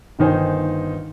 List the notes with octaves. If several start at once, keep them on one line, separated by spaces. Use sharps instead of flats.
G1 D#3 D#4 C5 G#5